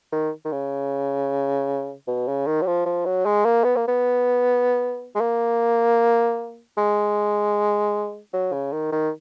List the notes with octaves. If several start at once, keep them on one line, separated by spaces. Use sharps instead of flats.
D#3
D#3
C#3
B2
C#3
D#3
F#3
F3
F3
F#3
G#3
A#3
B3
A#3
B3
G#3
A#3
G#3
F#3
C#3
D#3
D#3